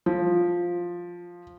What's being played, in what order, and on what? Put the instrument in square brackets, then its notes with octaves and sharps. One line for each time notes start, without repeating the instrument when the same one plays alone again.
[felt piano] F3